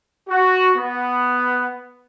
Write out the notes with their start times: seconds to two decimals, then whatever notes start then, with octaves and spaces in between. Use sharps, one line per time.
0.29 F#4
0.77 B3